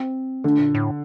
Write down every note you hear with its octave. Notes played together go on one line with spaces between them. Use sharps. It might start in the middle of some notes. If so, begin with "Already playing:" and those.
Already playing: C4
D3 A3
A#2
A2